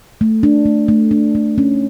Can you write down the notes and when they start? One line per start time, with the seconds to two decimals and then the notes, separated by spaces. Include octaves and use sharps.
0.21 A3
0.43 D4
0.66 A3
0.88 A3
1.11 D4
1.35 A3
1.58 C#4